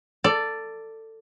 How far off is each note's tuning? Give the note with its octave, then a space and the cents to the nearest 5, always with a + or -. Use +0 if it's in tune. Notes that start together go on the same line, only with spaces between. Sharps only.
A4 +20 D5 +0